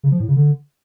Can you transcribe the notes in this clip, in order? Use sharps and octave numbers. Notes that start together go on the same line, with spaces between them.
C#3
F3
A2
C#3
D3